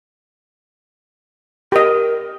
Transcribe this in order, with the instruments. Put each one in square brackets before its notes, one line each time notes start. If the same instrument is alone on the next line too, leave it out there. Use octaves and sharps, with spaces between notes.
[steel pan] G4 D#5 [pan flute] A#4